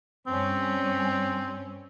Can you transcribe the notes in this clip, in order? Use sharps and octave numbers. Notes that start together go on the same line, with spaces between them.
G2 C4 C#4